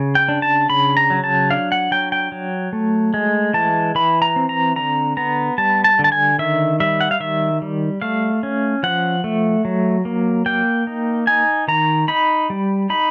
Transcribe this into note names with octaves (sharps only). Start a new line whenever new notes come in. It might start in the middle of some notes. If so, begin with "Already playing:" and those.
Already playing: C#3
G5
D4
A5
C#3 B5
A#5
F#3
A5
D4 F5
F#5
F#3 G5
G5
F#3
A3
G#3
E3 A5
E3 B5
A#5
C4
A#5
D3 A#5
B3 A#5
G3 A5
A5
D3
A5
G#5
D#3 E5
G3 E5
F#5
F5
D#3 E5
G3
A3 F5
C#4
F3 F#5
A3
F#3
A#3
A#3 G5
D#4
D#4 G#5
D#3 A#5
D#4 B5
G3
D#4 B5